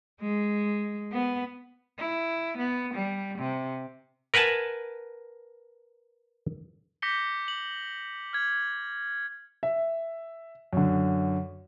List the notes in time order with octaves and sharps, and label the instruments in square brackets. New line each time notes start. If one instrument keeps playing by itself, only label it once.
[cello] G#3
B3
E4
B3
G3
C3
[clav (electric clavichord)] A#4 B4 F#5 G#5 A5
[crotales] D6 G6 A#6 B6 C#7 G7
F#7
F6 G#6
[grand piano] E5
F#2 D3